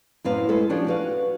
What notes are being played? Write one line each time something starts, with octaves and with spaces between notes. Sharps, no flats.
F#2 A2 C4 B4 F5
G#3 A4 B4 C5
F3 C#4 D4 G4
F#4 B4 F5